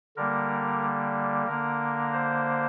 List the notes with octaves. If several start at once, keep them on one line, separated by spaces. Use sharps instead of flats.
D3 G3 A#3 A#4
D3 A#3 A#4
C5